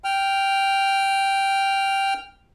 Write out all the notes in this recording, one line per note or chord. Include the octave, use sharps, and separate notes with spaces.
G5 F6